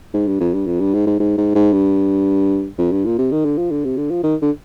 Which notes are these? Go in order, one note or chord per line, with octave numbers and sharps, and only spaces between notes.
G#2
G2
F2
G2
F2
G2
G#2
G#2
G#2
G#2
G#2
G2
F2
G2
A#2
C3
D#3
D3
F3
D3
C3
D3
F3
D#3
D3